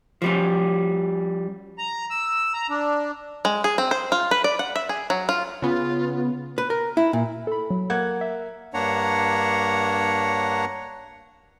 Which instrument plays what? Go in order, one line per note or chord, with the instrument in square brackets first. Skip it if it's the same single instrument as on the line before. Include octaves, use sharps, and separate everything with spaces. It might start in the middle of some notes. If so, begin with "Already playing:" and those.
[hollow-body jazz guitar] F3 G3 C#4
[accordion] A#5
E6
A#5
D4
[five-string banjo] G#3
G#4
C4
C5
F4
B4
D5
F#5
E5
G#4
F#3
F4
[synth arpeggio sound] C#3 B3 [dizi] F4
[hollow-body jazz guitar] B4
A#4
E4
A#2
[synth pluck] A4 B5
F#3
[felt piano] A#3 F#6 G#6 [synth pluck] F#5
[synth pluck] E5
[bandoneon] G2 A#3 D4 C#5 F#5 A#5